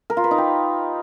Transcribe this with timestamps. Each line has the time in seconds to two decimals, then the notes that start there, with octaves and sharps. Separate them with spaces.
0.10 A#4
0.17 F4
0.24 B4
0.31 D#4
0.38 G4